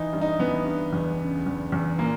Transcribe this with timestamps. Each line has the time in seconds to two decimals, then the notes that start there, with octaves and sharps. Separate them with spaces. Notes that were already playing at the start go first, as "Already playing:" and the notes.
Already playing: E3 D#4
0.13 G2
0.21 D#4
0.39 E3 B3
0.65 G2
0.93 E2
1.19 C#3
1.46 E2
1.72 E2
1.99 A#2 A#3